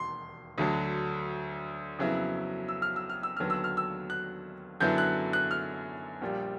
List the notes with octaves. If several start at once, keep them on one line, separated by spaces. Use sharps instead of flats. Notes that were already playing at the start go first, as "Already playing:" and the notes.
Already playing: E1 D#2 C6
D2 D3 F#3
F2 C#3 F#3 B3 E4
E6
F6
E6
F6
E6
D#2 D3 F#3 B3 F6
E6
F6
E6
F#6
F#2 D3 F#3 B3 E4 G6
F#6
F#6
F6
A#1 A#2 G3